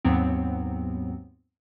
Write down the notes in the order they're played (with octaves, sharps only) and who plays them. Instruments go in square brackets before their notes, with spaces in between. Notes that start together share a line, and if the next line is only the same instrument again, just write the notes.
[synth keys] D#2 G#2 F#3 B3 C4